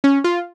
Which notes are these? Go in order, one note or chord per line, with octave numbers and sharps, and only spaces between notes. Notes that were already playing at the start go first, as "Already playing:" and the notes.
C#4
F4